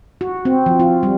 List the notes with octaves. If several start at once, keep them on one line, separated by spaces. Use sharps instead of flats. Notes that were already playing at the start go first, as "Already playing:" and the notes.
F#4
C4
F3
F4
G3